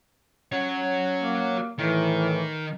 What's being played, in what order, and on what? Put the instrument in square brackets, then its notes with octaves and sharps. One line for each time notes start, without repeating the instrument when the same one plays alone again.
[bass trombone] C#4 [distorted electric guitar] F#4 C#5
[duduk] A#3
[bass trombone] A2 [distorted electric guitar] D#3 [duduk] E3